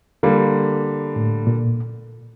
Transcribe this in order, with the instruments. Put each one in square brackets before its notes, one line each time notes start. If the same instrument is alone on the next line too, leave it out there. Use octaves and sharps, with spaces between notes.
[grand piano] D3 G3 A#3
[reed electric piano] A2
A#2